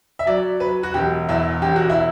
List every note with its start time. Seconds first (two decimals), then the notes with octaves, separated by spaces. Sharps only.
0.19 E5
0.26 F#3 D5
0.60 F#3 B4
0.83 F#4
0.94 E1 G4
1.29 E2 E4
1.62 E1 G4
1.76 F#4
1.90 E4